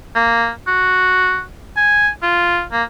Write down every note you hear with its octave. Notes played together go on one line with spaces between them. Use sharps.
A#3
F#4
G#5
F4
A#3